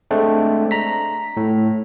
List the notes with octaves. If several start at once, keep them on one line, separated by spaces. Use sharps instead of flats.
G#3 A3 C4 D4
A#5 B6
A2